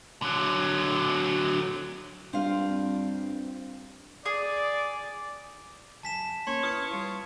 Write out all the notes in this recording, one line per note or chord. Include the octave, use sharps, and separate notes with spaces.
D3 F#3
G2 C4 F4 F5
G#4 D5
C#2 F#2 G#5 A5 B6 E7
A#3 C#4 C#5 C6
E4 B4 D#6 F6 C#7
G3 F4 C#6